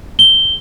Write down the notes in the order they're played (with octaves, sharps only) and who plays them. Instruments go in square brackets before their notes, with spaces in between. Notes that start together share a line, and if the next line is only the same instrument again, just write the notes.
[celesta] G7